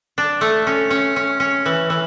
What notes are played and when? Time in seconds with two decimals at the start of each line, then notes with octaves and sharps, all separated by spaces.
0.18 D4
0.41 A3
0.67 C#4
0.90 C#4
1.16 C#4
1.40 C#4
1.66 E3
1.90 E3